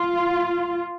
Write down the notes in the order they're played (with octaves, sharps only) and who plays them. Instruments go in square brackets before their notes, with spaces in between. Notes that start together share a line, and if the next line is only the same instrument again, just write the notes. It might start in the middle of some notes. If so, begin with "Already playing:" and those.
Already playing: [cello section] F4